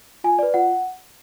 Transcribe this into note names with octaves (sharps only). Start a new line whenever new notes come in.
F4 G#5
B4 D5
F4 F#5